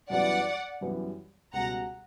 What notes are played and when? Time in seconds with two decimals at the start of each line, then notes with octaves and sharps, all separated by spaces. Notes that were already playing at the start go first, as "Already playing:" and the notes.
0.10 F#2 E3 G3 B3 D5 F#5
0.81 F#2 E3 G3 B3
1.53 C#2 B2 G3 F#5 A#5